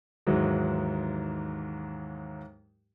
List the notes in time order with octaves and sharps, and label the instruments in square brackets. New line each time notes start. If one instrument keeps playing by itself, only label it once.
[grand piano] D#2 G#2 E3 F#3 G#3